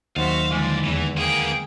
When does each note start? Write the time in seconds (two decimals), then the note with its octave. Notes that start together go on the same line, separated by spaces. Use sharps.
0.16 D#2 F#3 F#4 C5 E5 F5
0.52 D3 E3 F3 G#3 D5
0.84 E2 E3
1.17 A#3 B3 G#4 G5